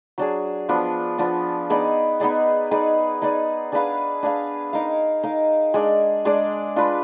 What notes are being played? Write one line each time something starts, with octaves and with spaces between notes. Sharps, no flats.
F#3 D4 G#4
F3 B3 D4
F3 B3 D4
B3 D#4 G#4 D5
B3 D#4 G#4 D5
D#4 G#4 B4 D5
D#4 G#4 B4 D5
D4 G#4 B4 F5
D4 G#4 B4 F5
D#4 A#4 F5
D#4 A#4 F5
G#3 D4 G#4 D5
G#3 D4 G#4 D5
D4 F4 B4